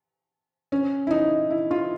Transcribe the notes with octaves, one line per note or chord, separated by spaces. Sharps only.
C#4
E4
D#4
E4
F4